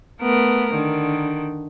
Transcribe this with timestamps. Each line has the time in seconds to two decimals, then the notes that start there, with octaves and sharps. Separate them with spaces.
0.21 A3 B3 A#4
0.73 D3 D#3